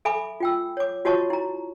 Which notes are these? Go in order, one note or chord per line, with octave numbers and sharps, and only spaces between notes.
A4 E5 G#5 B5 D6
F4 G5 E6
C#5 D6
F4 F#4 C#5 D#5 A5 C#6
E4 A#5